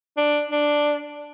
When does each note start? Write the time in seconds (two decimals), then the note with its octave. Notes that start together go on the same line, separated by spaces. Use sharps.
0.17 D4
0.51 D4